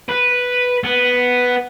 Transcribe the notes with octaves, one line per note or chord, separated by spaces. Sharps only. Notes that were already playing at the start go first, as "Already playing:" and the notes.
B4
B3